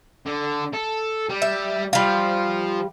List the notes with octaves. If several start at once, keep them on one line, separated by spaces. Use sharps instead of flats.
D3
A4
G3
E5
F3 G3 F4 F5